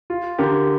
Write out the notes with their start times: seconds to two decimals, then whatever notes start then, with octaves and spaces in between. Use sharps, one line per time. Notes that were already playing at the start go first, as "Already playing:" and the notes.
0.10 F4
0.38 D3 G4 A#4